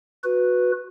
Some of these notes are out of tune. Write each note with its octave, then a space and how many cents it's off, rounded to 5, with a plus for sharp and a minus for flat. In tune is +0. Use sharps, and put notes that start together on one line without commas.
F#4 -15 B4 +0